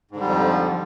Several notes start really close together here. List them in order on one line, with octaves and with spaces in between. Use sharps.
G#2 D3 G3 F2 F3